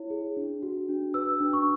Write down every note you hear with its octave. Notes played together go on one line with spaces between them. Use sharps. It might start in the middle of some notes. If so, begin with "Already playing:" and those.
Already playing: E4 C#5
G#4
D4
F#4
D4
B4 E6
D4
C#6